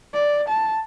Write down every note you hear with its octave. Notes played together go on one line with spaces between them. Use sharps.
D5
A5